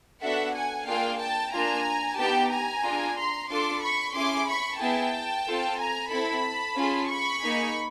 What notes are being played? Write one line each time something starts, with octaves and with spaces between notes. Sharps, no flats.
B3 D4 F#4 A4 E5 F#5
F#5 G#5
A#3 D4 F4 G#4 F5 G5
G5 A5
A#3 D4 F4 G#5 A#5
B3 D#4 G4 G5 A5
G#5 A#5
D4 F4 G#4
A#5 C6
D4 F4 A4 C6 D6
B5 C#6
C#4 E4 G#4 C6 D6
B5 C#6
B3 E4 G#4 G5 A5
C4 F4 A4
G#5 A#5
C4 E4 A4 A5 B5
C#4 F4 G#4
B5 C#6
A#3 D#4 G#4